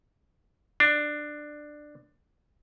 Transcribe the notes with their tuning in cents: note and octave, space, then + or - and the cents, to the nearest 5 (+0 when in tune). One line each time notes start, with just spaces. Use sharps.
D4 +15